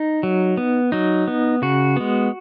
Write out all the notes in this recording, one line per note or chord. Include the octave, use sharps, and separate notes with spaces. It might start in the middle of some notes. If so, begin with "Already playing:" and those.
Already playing: D#4
F#3
B3
F#3 D#4
B3
C#3 F#4
G#3 B3